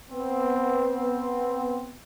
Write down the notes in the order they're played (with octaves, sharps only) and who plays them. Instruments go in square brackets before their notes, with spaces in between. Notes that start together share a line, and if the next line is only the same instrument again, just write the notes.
[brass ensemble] B3 C4